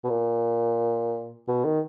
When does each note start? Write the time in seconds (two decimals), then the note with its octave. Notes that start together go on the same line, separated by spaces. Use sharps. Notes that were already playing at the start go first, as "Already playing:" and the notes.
0.04 B2
0.10 A#2
1.48 B2
1.65 D#3